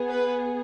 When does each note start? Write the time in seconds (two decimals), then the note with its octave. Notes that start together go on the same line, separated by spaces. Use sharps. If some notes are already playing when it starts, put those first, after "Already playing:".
Already playing: B3 G#4
0.10 B4